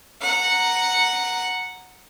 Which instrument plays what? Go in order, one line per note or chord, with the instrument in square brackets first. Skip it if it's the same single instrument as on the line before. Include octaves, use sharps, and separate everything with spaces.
[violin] F#5 A#5